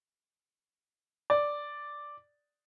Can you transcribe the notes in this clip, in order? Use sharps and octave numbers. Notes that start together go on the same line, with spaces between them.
D5